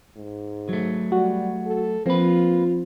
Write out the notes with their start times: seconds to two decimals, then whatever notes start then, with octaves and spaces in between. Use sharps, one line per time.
0.17 G#2
0.69 F#3 A3
1.12 G3 F#4
1.66 A4
2.06 F3 A#3 C4 F4 B4